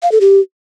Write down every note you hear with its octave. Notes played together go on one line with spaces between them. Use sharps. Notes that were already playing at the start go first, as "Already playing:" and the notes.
F5
A4
G4